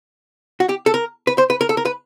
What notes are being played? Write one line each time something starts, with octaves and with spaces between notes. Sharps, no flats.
F#4
G4
A4
A#4
B4
C5
B4
A#4
A4
A#4
B4